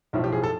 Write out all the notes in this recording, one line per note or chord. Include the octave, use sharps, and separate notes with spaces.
B1 A2 F3 E4
G4
G#4
A4